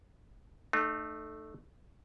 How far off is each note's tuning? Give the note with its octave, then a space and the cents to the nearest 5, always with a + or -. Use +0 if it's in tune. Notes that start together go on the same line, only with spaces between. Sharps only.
A3 -5 D#4 -40